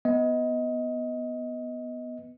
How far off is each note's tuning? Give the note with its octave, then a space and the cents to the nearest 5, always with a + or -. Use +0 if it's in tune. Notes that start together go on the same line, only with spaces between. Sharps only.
B3 +0 D#5 +20